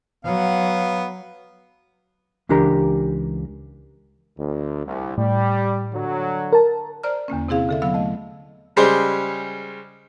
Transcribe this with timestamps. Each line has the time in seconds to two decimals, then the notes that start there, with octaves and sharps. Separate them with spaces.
0.25 F#3 B3 F5
2.49 C#2 E3 D4 G4 A#4 A#5
4.38 D2
4.86 C2
5.18 A2 G3
5.93 D3 F#3
6.53 A#4 A5
7.03 C5 D5 A#5 F6
7.28 E2 D3 A#3 C#4
7.49 C3 C4 E4 G#4 F5
7.69 D3 A4 E5
7.82 D3 F#3 B3 F5 E6
7.94 A3 D#5
8.76 C#3 G3 G#3 C5